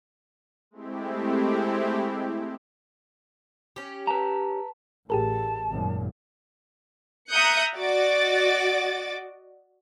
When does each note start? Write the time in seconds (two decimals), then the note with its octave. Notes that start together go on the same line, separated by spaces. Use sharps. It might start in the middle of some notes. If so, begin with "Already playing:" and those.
0.71 G#3 A3 C4 E4 G4
3.76 C#4 G4
4.07 B4 A5 A#5
5.10 A1 A2 G4 G#4 A#4 A5
5.70 G#1 F#2 A#2
7.29 E5 A#5 D#6 F#6 G6 C#7
7.75 F#4 D5 D#5 D6 A6